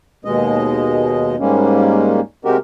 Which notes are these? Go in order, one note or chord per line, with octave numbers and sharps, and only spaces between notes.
D#2 B2 G#3 D#5
G#2 G3 G#3 A#3 C#4
C3 G#3 F#4 G4 A#4